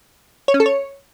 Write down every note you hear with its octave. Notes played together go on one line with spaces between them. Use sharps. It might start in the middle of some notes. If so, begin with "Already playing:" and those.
C#5
C#4
A4
C#5